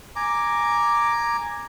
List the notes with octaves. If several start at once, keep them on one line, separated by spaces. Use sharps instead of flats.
G#5 A#5 D6